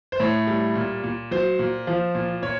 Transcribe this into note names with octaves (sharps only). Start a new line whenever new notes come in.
C5
A2 C#5
G3
A#2
A#2
F#3 C5
A#2
F3
A#2
A#2 C#5